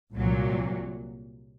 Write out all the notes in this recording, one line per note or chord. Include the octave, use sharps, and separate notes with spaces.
C2 A#2 F#3